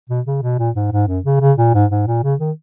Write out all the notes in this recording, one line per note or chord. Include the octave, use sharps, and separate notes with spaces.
B2
C#3
B2
A#2
G#2
G#2
F#2
C#3
C#3
A#2
G#2
G#2
A#2
C#3
D#3